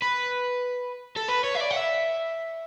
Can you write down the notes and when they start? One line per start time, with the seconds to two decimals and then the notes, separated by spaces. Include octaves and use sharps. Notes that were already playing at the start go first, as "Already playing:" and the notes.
0.02 B4
1.16 A4
1.28 B4
1.44 C#5
1.55 E5
1.61 D5
1.71 F#5
1.76 E5